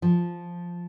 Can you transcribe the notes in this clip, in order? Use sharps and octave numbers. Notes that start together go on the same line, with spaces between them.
F3